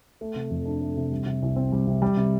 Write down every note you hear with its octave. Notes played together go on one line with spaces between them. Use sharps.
A3
C3
F2
D4
A3
C3
G3
C3
C2
C4
G3
C3
G3
C3